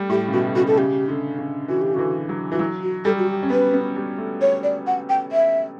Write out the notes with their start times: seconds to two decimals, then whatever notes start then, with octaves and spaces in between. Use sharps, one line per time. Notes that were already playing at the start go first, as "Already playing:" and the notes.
Already playing: G3 A3
0.09 A2 G4
0.28 C#3
0.33 B2 F#4
0.56 C#3 F#4
0.67 A4
0.78 C#3 G4
1.08 D3
1.39 C#3
1.68 E3 F#4
1.82 G4
1.94 D3 F#4
1.99 E3
2.29 F#3
2.52 E3 F#4
2.59 F#3 E4
2.82 F#4
3.05 G3 A4
3.19 F#4
3.28 G4
3.43 C#4
3.50 B3 B4
3.74 B3
3.96 G3
4.18 A3
4.41 C#5
4.63 D5
4.87 F#5
5.09 G5
5.32 E5